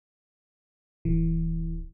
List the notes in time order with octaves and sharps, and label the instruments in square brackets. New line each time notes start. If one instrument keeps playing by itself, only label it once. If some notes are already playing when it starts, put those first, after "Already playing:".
[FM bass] D1 [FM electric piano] E3